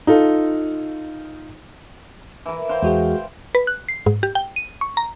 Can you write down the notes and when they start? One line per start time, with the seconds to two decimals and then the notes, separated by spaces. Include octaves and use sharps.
0.07 D#4 F4 A4
2.46 E3 A#4
2.69 C5 F5 G5
2.83 E2 G#3 F#4 G#4
3.55 B4
3.67 F#6
3.89 C7
4.06 G#2
4.23 G4
4.35 G5
4.56 D#7
4.81 C#6
4.97 A#5